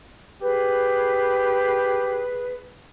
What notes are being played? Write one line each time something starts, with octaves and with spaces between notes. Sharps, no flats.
G4 G#4 B4